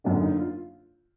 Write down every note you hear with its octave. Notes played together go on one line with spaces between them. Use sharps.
F#1 F#2 D3 D4
D#4
F4